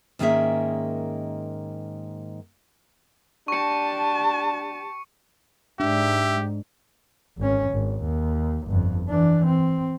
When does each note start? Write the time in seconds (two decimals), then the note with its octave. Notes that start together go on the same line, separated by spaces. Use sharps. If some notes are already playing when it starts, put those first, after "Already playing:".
0.19 G#2 D#3 A#3 C#4 G#4 E5
3.48 D4 G4 A5 C#6 C#7
5.80 G#2 D4 G4 E5
7.38 G#1 C#4
7.70 G#1
8.02 D#2
8.67 G1 F2
9.09 E3 D4
9.46 C4